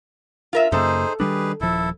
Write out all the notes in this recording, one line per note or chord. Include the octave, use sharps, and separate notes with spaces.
F4 A#4 E5
F#2 C#3 A#3 D#4 G#4 A4 C5
D#3 G3 D4 G4 G#4 B4
D#1 F3 E4 A4